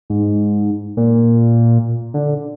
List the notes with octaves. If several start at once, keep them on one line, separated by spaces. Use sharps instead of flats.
G#2
A#2
D3